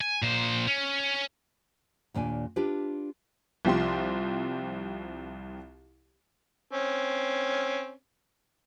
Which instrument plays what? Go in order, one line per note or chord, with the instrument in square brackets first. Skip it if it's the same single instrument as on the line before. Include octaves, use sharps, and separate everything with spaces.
[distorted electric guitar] G#5
A#2 C5
C#4
[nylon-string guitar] D#2 A#2 D4 G#5
D4 F4 G4 B4
[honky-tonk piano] C2 F3 C4 G4 C6
[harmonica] C4 C#4